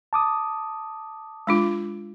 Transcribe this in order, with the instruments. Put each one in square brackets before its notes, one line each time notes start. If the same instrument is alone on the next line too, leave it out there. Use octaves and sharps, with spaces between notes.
[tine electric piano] A5 D6 D#6
[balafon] G#3 D4 F4